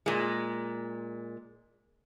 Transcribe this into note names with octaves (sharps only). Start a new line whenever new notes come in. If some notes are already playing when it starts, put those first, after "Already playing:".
A#2 G#3